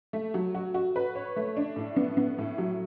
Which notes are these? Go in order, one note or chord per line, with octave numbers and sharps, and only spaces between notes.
A3
F#3
F#4
F#4
B4
C#5
A3
D4
A2
B3
B3
A2
F#3